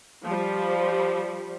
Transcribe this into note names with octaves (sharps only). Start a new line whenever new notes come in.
F3 G3